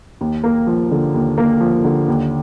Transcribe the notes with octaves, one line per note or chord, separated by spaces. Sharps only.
D#2
A#3
F3
D3
D#2
A#3
F3
D3
D#2